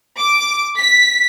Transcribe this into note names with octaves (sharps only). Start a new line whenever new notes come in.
D6
B6